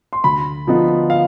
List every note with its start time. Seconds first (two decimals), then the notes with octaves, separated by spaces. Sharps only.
0.13 C6
0.24 D2 B5
0.67 D3 F3 B3 D#4
1.10 F5